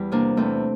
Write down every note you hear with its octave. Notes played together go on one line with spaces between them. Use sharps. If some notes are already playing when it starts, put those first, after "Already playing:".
Already playing: E2 G3
C3 A#3 D4
E2 A3 C4